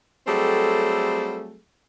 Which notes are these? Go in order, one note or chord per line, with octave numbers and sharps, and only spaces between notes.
F#3 G3 A3 C4 G#4 A4